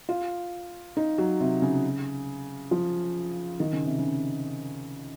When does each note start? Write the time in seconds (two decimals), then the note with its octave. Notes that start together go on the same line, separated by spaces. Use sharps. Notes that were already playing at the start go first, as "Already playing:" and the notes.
0.09 F4
0.97 D#4
1.18 F#3
1.40 C3
1.62 C#3
2.71 F3
3.60 D#3
3.73 C#3
3.86 C3
3.99 C#3